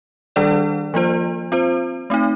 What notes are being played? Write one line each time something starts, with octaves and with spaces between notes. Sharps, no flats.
D#3 G3 D4 A4 D5
F3 A#3 F4 C5
C4 F4 C5
A3 C4 D#4